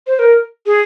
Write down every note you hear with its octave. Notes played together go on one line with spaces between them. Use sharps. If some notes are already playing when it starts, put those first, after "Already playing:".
C5
A#4
G#4